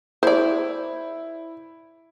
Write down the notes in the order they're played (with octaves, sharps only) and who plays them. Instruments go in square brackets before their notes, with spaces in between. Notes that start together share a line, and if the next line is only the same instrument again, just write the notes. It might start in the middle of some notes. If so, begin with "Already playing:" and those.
[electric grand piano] E4 [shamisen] C5 D5